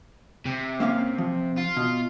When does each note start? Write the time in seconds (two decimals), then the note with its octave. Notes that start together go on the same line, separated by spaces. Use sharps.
0.45 C3
0.80 A#3 C#4 F5
1.18 F3
1.58 F4
1.77 B2